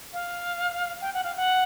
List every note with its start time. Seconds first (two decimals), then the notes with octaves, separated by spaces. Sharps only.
0.13 F5
1.01 G5
1.14 F#5
1.24 F5
1.36 F#5